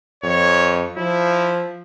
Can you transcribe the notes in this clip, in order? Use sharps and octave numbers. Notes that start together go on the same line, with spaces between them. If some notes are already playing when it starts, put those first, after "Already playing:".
F2 C#5
F3 E4